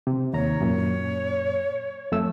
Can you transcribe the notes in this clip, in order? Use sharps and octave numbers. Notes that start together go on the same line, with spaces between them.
C3
D#2 C#5 A#5
F#2 A#2
F2 A3 E6